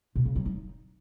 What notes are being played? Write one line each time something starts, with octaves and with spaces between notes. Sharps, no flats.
B2
C#3
F#3
D#4